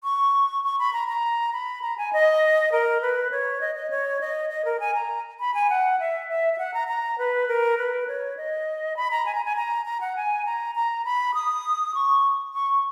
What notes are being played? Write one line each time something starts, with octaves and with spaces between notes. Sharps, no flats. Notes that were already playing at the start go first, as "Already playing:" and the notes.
C#6
C#6
B5
A#5
A#5
B5
A#5
G#5
D#5
A#4
B4
C#5
D#5
D#5
C#5
D#5
D#5
A#4
G#5
A#5
B5
G#5
F#5
E5
E5
E5
F#5
A#5
A#5
B4
A#4
B4
C#5
D#5
B5
A#5
G#5
A#5
G#5
A#5
A#5
F#5
G#5
A#5
A#5
B5
D#6
C#6
C#6